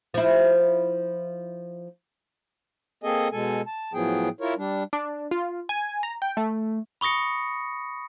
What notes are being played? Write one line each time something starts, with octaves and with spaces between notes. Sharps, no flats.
F3 E4
A#3 C4 G#4 A4 D#5 G#5
B2 G#3 A4 G#5
A5
A2 F3 F#3 B3 G#4 G5
E4 F4 A#4 C#5
G3 D4
D4
F4
G#5
A#5
G5
A3
B5 C#6 D#6 A#6 C#7